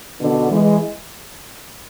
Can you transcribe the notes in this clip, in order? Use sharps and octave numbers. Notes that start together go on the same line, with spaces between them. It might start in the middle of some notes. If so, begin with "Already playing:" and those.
B2 D3
E3 G#3